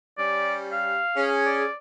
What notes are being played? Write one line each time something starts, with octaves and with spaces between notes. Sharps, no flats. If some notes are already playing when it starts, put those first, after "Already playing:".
G3 C#4 D5
F5
C#4 G#4
D5